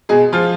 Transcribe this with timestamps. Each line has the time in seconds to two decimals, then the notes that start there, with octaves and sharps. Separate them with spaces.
0.09 B2 G#3 G#4
0.32 F3 F4